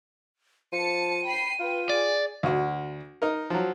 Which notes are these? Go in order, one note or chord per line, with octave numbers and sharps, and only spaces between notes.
F3 A5 C#7 D#7
G5 B5 C7
F4 B4 G5
G#4 D5
D2 F#4
D#4 A#4
F3 F#3